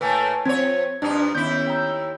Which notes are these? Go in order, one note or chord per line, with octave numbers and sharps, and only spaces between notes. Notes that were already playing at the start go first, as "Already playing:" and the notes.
A2 A3 A#3 B4 G#5 A5
F3 C4 C#5 G#6
G2 F3 D4 D#4
D#2 B3 C#4 E4 G6 B6
G5 A#5 E6